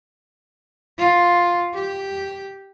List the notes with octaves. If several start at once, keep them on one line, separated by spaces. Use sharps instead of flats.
F4
G4